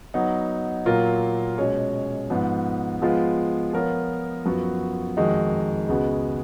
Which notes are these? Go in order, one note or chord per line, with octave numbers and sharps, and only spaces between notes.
F#3 B3 D#4
A#2 F#3 A#3 F4 A#4
B2 G#3 C#4 F#4 C#5
G#2 F3 B3
F3 G#3 B3 F4
F3 B3 F4 A#4 C#5
F#2 F3 B3 F#4
F2 D#3 G#3 D#4 F#4
C#2 C#3 G#3 B3 F#4